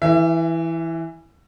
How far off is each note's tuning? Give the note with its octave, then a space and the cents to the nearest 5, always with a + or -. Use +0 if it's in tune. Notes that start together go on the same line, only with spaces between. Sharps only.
E3 +0 E5 +35